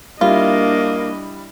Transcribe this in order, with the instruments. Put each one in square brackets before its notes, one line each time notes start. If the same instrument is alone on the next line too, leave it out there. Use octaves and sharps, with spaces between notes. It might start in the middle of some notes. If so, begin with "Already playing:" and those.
[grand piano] G3 E4 [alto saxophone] A#3 [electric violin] D4 D#5 [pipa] F4